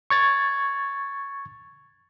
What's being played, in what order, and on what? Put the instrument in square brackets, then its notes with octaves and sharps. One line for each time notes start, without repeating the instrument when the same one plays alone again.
[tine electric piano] C#6 G#6 A6